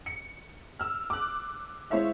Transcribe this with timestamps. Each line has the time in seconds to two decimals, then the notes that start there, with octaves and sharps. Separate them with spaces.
0.06 C#7
0.79 E6 F6
1.10 D6 F#6
1.90 G#3 E4 C5 C#5 E5 F5